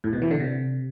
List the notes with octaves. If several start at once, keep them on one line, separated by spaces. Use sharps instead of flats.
A2
B2
E3
D3
C3